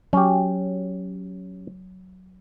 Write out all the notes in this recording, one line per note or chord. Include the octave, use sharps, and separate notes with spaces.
F#3 C#4 G4